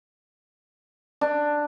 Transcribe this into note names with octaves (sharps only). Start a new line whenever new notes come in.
D4